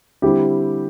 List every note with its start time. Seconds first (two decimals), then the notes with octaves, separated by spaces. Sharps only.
0.22 D3 G3 C4 E4 G4